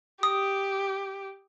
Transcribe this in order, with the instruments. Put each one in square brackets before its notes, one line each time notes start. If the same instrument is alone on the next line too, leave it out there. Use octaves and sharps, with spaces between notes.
[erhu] G4 [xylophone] D#6